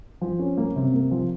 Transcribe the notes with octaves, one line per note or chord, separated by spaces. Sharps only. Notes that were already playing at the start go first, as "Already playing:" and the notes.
F3
C#4
A#3
C3
A#3
F3